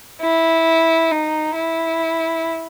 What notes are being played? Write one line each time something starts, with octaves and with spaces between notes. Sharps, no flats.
E4
D#4
E4